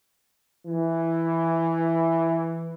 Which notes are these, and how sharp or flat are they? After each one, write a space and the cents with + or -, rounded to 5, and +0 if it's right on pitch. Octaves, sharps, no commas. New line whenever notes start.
E3 +5